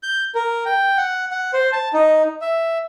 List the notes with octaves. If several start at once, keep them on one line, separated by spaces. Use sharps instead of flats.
G6
A#4
G5
F#5
F#5
C5
A5
D#4
E5